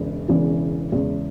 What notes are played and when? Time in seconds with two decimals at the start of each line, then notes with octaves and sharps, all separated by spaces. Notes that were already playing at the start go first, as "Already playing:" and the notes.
Already playing: E1 E2 C#3
0.28 E1 E2 C#3 E3
0.92 E2 C#3 G#3